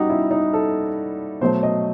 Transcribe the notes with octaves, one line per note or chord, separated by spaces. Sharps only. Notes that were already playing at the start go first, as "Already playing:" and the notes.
Already playing: G3 D#4 F#4 G4
E4
D#4
A4
B2 F#3 A3 C5
D#5